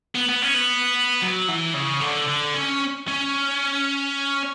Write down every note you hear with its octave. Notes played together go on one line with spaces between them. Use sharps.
B3
B3
C#4
B3
F#3
E3
C#3
D3
D3
C#4
C#4